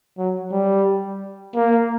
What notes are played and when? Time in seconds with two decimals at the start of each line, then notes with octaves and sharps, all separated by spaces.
0.18 F#3
0.52 G3
1.55 A#3